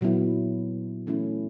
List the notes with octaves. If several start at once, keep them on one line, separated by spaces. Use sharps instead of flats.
A#2 F#3 B3 E4
E3 A3 C#4 E4